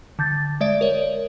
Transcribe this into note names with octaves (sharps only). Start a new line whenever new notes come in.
D3 G6 A6
G#3 D5 E5 D7
A#4 C#5